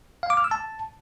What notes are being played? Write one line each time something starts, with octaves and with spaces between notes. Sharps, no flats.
F5
D6
F6
E6
A5